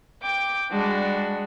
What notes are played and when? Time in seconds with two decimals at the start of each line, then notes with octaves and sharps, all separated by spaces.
0.22 G5 D6
0.71 G3 G#3 D4 F#4